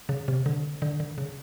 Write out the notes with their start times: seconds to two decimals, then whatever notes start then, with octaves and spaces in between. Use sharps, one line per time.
0.09 C#3
0.28 C3
0.46 D3
0.82 D3
1.00 D3
1.18 C#3